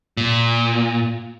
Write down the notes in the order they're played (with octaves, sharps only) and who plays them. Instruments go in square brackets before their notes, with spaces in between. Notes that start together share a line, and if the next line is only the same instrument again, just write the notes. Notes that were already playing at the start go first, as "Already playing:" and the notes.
[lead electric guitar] A#2